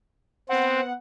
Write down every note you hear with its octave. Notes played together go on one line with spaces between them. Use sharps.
B3 C4 F#5